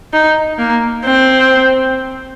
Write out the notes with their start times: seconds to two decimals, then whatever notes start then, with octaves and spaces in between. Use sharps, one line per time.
0.13 D#4
0.59 A#3
1.05 C4